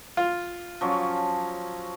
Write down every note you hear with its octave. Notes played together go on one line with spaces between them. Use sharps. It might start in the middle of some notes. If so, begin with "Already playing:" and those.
F4
F3 F#3 C#4